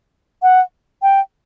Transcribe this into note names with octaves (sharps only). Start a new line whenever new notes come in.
F#5
G5